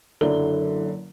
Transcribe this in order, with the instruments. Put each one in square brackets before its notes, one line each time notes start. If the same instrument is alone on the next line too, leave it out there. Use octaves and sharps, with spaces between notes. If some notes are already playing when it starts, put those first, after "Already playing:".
[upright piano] F#1 D3 F#3 E4 D5 G7